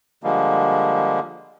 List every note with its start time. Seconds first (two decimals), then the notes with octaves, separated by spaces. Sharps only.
0.23 D3 F3 G3 G#3 A#3